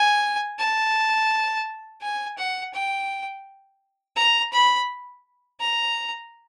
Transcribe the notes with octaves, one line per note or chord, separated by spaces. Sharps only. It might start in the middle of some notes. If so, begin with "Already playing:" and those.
Already playing: G#5
A5
G#5
F#5
G5
A#5
B5
A#5